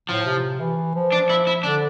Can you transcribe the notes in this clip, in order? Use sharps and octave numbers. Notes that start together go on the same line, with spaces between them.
A2 F3
C3
E3
F3
D4
E4
E4
D3 D4